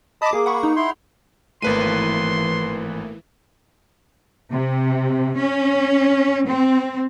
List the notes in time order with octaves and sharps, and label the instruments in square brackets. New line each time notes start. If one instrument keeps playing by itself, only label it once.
[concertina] D#5 A5 B5 [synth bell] D6 D#6
[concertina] A#3 [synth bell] G#4
[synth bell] F#5 B5 C#6
D#4
[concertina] E4 C6
[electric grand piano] G#1 B4 D#7 [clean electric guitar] A2 A3 A#3 [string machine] E3 [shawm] C6
[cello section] C3
C#4
C4